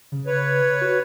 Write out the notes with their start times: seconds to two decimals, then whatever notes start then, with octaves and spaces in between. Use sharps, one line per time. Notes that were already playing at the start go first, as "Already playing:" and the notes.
0.12 C#3
0.26 B4 C#5
0.81 F#4